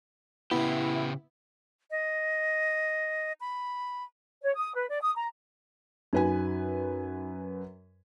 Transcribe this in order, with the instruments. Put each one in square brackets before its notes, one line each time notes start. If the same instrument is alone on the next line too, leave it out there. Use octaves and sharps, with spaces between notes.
[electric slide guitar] C#3 G4 [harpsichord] B3 [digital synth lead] E4
[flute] D#5
B5
[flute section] C#5
D#6
B4
D5
D#6
A#5
[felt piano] F#2 B4 G#5 [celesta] D#4 F#4